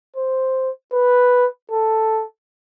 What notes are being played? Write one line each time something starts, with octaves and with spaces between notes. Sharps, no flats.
C5
B4
A4